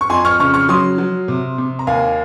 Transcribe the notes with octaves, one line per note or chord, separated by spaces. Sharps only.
C#6
F2 G#5 C6
C#6 F6
C#3 C#6 F6
C#6 F6
F#3 C6 D#6
F#3
C3
C3
A#5
D#2 F5 G#5